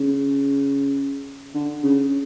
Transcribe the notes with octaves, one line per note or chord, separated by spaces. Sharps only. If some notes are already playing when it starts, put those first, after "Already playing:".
Already playing: C#3
D3
C#3